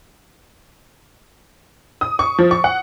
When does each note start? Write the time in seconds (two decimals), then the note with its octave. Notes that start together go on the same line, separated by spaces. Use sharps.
2.01 D#6
2.19 C#6
2.38 F3
2.51 C#6
2.64 F#5